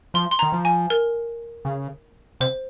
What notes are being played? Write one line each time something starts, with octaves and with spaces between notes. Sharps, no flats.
F3 C6
C6
D#3 A#5
F3
G#5
A#4
C#3
C3 C5